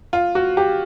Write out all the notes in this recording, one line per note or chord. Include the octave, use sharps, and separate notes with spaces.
F4
F#4
G4